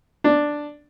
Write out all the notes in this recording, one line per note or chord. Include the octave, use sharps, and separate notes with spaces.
D4